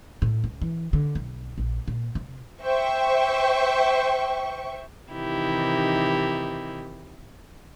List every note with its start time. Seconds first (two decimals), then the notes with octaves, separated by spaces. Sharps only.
0.22 A2
0.44 C#2
0.62 E3
0.93 D3
1.15 B1
1.58 A#1
1.88 A#2
2.15 C3
2.62 C5 E5 G5 C#6
5.10 C3 D#3 E3 D#4 E4 G4